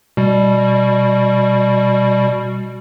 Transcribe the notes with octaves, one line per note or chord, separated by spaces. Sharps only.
B2 G3